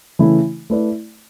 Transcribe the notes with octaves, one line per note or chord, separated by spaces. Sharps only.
C#3 E3 A3 E4
A3 E4 B4 D5